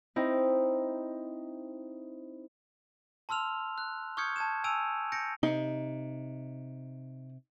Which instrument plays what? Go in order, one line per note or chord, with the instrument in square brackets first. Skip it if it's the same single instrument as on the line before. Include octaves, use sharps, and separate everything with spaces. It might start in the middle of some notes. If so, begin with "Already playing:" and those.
[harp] C4 D#4 E4
[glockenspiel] A5 C6 E6 F6 F7
F#6
C#6 D#6 F6 G6 G#6 C#7
A5 G#6 E7
G#5 A5 E6 D7 D#7 F7
G6 A#6 C#7 D7
[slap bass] C3 [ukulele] D#4